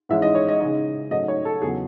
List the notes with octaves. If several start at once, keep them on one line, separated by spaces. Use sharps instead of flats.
G#2 E3 G#3 C#4 E5
D#5
C#5
D#5
C#3 G#3 D#4 D#5
G#2 F#3 A3 C#4 D#5
C#5
A4
E2 C#3 F#3 G#4